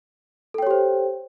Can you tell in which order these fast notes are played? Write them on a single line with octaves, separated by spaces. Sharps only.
A4 G5 C#5 G4 C5